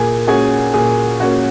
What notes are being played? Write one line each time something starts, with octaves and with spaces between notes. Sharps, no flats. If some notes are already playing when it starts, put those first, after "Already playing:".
Already playing: A#2 G#4 G#5
A#3 C#4 F#4 G#4 G#5
A#2 G#4 G#5
A#3 C#4 F#4